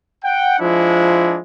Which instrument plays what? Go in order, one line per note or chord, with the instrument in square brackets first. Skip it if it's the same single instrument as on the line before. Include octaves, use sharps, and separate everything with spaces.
[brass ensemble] F#5 G5
F3 G#3 D4 E4